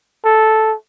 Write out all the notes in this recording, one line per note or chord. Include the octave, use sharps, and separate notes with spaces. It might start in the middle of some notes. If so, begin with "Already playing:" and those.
A4